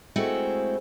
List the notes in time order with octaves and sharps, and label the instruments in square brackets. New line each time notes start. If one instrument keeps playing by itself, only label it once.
[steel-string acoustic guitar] G#3 A3 C4 E4 F#4 G#4